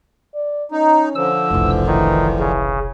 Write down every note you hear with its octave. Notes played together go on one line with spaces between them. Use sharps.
D5
C#4 D#4
D3 F3 E6
F1 B1 E3
D#3 E3
C#3